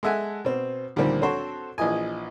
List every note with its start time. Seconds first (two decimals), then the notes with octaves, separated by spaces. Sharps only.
0.03 G#3 A4 E5 F#5 G#5
0.45 B2 C4
0.96 D2 A#2 D#3 F3 G3 C4
1.22 C4 D4 F#4 A4 C5 C#5
1.78 A#1 E3 F3 D#5 G#5